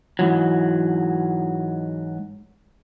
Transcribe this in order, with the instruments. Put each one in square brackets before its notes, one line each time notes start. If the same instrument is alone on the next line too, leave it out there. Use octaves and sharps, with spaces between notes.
[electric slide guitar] G#2 E3 F#3